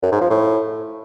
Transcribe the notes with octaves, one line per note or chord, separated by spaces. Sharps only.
F#2
G#2
F3
A2